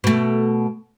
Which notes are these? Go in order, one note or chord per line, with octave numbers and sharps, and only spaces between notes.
B2 A3